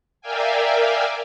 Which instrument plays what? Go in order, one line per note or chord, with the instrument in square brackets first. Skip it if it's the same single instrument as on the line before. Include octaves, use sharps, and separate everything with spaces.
[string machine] A#4 D5 E5 F5 G5 G#5